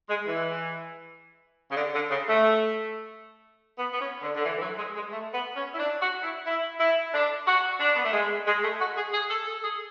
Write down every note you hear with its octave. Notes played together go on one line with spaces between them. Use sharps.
G#3
E3
C#3
D3
D3
C#3
A3
B3
B3
C#4
D3
D3
E3
E3
F#3
G#3
G#3
A3
B3
C#4
E4
D4
F#4
E4
E4
E4
D4
F#4
D4
B3
A3
G#3
G#3
A3
F#4
G#4
G#4
A4
A4
G#4